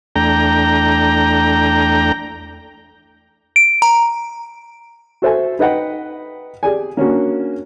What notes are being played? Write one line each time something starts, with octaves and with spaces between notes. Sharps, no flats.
E2 A3 D4 G5 A#5
D7
A#5
F#4 A4 C5 E5 G#5
D#4 B4 D#5 F#5 G5
G4 G#4 D5 G#5
A#3 C#4 D4 F#4